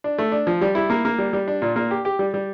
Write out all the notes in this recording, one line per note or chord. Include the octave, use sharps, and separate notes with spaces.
D4
A3
D4
F3
G3
E4
A#3
A#3
G3
G3
D4
A#2
A#3
G4
G4
G3
G3